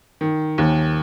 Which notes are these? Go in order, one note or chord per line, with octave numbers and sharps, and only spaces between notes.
D#3
D#2